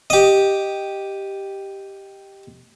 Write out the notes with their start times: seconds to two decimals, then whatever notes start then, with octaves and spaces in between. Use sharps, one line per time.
0.10 G4 D#5